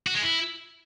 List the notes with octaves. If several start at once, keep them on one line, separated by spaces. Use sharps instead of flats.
F#4
G#3
E4